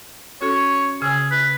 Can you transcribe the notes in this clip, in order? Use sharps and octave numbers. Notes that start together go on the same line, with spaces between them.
C#4 F#4 A4 C#5
C#3 G#4 G#5 E6
B4